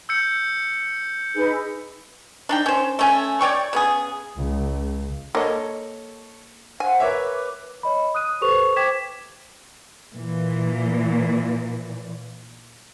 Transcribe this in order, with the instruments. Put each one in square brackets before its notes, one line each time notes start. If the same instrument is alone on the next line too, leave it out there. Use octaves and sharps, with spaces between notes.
[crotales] E6 G6 C#7
[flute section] D#4 G#4 B4
[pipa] D4 D#4 G5
C#4 C5
A3 C#4 G#5
C#5 D5 G5 C#6
C#3 B3 G#4
[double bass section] C#2
[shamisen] A#3 D#5 [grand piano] A4 C#5
[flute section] C5 F5 F#5 [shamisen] G#5
[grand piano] A#4 C#5 E5 [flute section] B4 D6
[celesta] C#5 D#5 B5
D#6 F#6 D#7
G4 A4 B4 C5 C#6 F7
C5 G5 D6 G#6 B6 E7
[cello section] A#2 E3